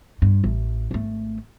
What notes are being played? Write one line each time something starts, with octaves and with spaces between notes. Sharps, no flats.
G2
A1
G#1 A3